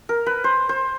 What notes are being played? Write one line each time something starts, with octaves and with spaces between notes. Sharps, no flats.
A#4
B4
C5
C5